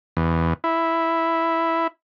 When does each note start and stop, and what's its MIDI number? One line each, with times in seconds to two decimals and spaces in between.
0.17 0.53 40
0.64 1.87 64